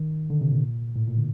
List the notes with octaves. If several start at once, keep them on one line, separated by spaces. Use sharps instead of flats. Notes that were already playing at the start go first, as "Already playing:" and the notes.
Already playing: D#3
D3
C3
A#2
A2
A#2
D3